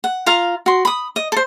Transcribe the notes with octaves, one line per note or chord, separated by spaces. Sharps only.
F#5
F4 F5 A#5
F#4 C6
B5 D#6
D#5
A4 C5